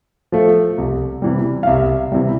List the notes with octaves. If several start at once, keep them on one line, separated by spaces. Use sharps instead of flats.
F3 A3
C2
C3 E3 G3
F5
C2 E5
C3 E3 G3